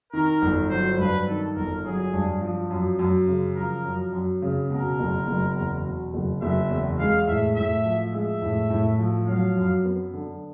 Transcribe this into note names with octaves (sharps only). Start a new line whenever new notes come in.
D#3 A#4
G1
F#3 C5
G2 B4
D#3 A4
G1 A#4
F#3 G#4
G2
F3
F#2
F#2
C#3
F3 A#4
F#2
F#2
C#3
B2 A#4
F#1
F#1
E2
B2
F#1
F#1 E5
E2
G#3 F5
A2 E5
A2 E5
F3
G#3 E5
A2
A2
F3
F#3 F5
F#2
B3
D3